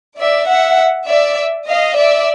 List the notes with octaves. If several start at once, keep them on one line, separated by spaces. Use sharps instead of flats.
D5 E5
E5 F#5
D5 E5
D#5 F5
D5 E5